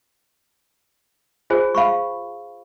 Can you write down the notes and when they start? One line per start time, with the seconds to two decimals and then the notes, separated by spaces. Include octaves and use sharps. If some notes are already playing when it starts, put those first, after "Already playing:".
1.50 F4 G#4 C5 G#5
1.75 F5 B5 C#6